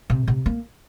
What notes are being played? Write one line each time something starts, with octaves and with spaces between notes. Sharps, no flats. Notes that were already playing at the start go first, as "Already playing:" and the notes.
C3
C3
A#3